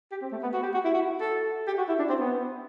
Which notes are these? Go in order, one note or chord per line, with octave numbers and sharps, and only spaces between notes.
G4
C4
A3
B3
F#4
G4
F#4
E4
F#4
A4
G4
F#4
E4
D4
C4
B3